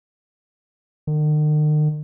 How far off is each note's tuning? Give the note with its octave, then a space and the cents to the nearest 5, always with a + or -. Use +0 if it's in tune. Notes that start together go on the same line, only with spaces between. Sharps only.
D#3 -45